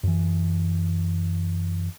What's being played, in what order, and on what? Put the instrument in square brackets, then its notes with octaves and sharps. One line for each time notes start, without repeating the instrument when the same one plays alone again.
[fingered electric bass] F#2 E3